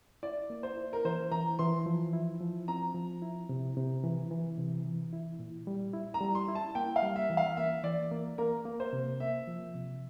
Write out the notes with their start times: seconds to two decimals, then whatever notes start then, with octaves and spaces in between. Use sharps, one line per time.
0.23 E4 D5
0.50 A#3
0.63 C5
0.77 E4
0.93 A#4
1.05 E3 C5
1.32 E3 A#5
1.59 E3 C6
1.86 F3
2.13 E4
2.41 F3
2.68 C4 A#5
2.95 F3
3.22 E4
3.49 C3
3.77 C3
4.03 E3
4.31 E3
4.58 C3
4.86 E3
5.13 E4
5.39 A#2
5.67 G3
5.93 E4
6.14 A#5
6.21 G3
6.35 C6
6.48 E4
6.55 A5
6.75 A#3 G5
6.96 F5
7.02 G3
7.16 E5
7.30 E3
7.37 F5
7.57 A#3 E5
7.84 E3 D5
8.11 A#3
8.38 A#3 A#4
8.65 A#3
8.80 C5
8.93 C3
9.20 A#3 E5
9.47 F3
9.74 C3